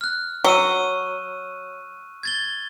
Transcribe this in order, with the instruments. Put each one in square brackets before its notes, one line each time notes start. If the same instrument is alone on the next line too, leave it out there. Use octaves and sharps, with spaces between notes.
[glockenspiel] F6 F#6
[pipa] F#3 [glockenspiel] C#6 E6 D#7
[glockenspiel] G#6 A6 G7